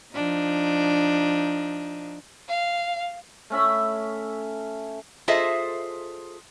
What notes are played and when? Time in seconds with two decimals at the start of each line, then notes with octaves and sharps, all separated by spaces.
0.13 F3 D4 D#4
2.49 F5
3.50 A3 C#4 E5 B5
5.28 F4 G#4 A4 C5 D#5 E5